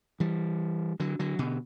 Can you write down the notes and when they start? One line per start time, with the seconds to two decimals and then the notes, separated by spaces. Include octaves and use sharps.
0.20 E3 G3
1.00 D3 F#3
1.19 D3 F#3
1.39 B2 D3